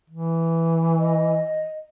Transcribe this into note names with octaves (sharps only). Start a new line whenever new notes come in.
E3
D#5